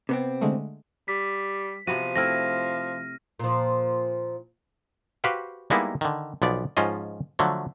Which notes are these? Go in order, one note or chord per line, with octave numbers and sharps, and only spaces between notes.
C3 B3 C4
D3 G#3 A3
G3 B6
C3 F3 B3 F#4 D#7
A3 C4 E4 F6 A#6
A#2 F3
F#4 G4 B4 C5 F5 G5
G3 G#3 A#3 B3 D#4 E4
D3 D#3
B1 F3 B3 D5
G#2 F3 C#4 F4 D#5
D3 F3 F#3 A3